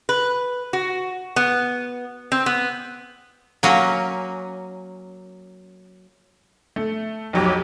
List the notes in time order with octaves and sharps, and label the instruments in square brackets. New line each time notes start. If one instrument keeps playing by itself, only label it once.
[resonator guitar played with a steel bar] B4
F#4
B3
C4
B3
[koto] F#3 A#3 C#4
[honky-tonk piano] A3
B1 F2 F#3 G4 C#5 D6